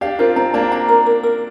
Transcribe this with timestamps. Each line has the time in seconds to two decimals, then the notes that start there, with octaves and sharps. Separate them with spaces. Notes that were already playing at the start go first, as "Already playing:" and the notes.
0.01 D4 G4 F5
0.19 C4 F4 A#4
0.36 C4 A#5
0.54 A#3 D4 A#5
0.72 A#5
0.88 A#4
1.06 A#4
1.23 A#4